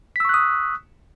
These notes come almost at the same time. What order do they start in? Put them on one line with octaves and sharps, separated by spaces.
B6 E6 C#6 F#6 D#6